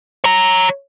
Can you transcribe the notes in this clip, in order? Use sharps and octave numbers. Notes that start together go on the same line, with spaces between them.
C#5 A#5